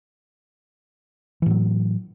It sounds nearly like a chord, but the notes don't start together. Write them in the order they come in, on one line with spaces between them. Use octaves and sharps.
E3 A2 F#3